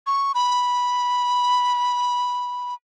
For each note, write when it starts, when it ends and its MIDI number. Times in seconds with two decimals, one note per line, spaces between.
0.07 0.32 85
0.35 2.74 83